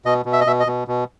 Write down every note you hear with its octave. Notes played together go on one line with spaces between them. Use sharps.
B2 D#5
B2
E5
D#5
B2 E5
D#5
B2
B2